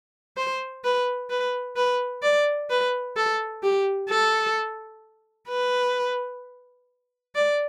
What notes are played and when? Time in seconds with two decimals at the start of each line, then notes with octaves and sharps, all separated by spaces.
0.37 C5
0.84 B4
1.30 B4
1.76 B4
2.23 D5
2.70 B4
3.16 A4
3.63 G4
4.10 A4
5.49 B4
7.35 D5